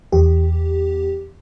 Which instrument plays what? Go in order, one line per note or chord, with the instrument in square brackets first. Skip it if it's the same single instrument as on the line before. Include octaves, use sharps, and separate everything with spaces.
[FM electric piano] E2 G4